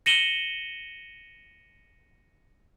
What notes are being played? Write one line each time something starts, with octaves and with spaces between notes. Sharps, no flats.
A#6 C#7 D#7 E7 F#7 G7